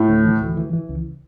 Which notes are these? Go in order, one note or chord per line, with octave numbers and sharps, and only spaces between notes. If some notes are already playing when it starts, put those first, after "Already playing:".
Already playing: A2
D2
E3
D2
E3
E3
C#2